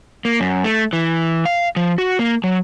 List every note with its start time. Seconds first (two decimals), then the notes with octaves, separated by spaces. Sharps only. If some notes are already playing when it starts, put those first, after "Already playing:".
0.25 A#3
0.40 F#2
0.64 A3
0.93 E3
1.46 F5
1.76 F3
1.98 F#4
2.19 A#3
2.44 F#3